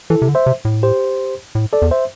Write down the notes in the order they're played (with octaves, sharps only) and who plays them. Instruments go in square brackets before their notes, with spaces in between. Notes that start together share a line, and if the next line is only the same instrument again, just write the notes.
[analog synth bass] E3 [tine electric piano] E4 A4
[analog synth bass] C3
D3
[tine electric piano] C5 E5
[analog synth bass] C3
A2
[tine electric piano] G4 C5
[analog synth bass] A2
[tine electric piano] A4 D5
[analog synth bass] E2
[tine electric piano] C5 E5